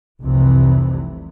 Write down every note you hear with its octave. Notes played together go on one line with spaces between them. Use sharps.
F1 C2 F2 C3 E3